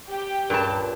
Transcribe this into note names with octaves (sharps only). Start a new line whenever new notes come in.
G4 G5
C#2 G2 A#2 A5